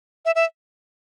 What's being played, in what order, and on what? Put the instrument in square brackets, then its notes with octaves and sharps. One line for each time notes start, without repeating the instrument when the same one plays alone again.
[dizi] E5
E5